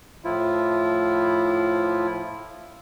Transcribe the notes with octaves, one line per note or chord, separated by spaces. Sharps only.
A2 F3 E4 F4